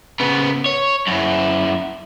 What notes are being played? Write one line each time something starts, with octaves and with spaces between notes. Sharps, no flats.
C#3 B3
C#5
F#2 E4